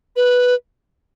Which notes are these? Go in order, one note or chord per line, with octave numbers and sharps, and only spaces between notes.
B4